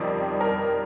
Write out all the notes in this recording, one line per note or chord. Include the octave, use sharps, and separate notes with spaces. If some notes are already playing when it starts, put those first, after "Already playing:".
Already playing: F2 D#3 G3 D5
A#4